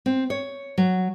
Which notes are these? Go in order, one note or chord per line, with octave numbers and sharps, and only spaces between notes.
C4
C#5
F#3